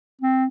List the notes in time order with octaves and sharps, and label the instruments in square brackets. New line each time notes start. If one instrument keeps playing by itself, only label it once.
[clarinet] C4